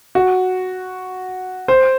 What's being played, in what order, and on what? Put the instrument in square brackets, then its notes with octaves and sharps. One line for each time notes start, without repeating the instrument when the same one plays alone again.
[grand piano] F#4
C5